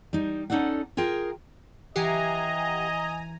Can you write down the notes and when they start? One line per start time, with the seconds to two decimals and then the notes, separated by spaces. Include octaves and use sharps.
0.13 G3 D#4
0.50 C#4 D#4 A4 D5 F#5
0.97 F4 G#4 A#4 G5
1.96 E3 G4 D#5 F#5 G#5 A#5 C7